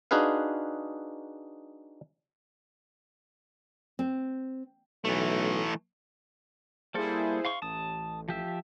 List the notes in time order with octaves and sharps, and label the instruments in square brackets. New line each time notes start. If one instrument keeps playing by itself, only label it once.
[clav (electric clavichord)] D4 D#4 F#4 G#4 B4 F5
[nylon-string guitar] C4
[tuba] B1 [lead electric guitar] E3 A3
[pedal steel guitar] G3 A#3 A4 [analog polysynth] E4 G#4 C5
[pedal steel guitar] F5 C6 C#6
[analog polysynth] A1 [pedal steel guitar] A5 D#6
[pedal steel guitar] F3 G4 E5